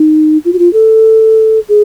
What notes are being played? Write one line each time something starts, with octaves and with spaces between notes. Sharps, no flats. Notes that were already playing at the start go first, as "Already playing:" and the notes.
Already playing: D#4
F4
F#4
F4
A4
G#4